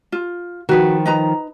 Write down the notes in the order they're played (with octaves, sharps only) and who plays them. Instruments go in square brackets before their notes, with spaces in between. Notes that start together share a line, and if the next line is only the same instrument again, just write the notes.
[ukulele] F4
[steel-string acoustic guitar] D#3 F3 [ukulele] F#4 B4
[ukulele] D#4 B4 A#5